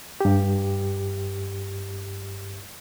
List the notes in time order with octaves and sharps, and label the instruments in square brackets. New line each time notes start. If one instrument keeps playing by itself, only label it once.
[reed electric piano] G2 G4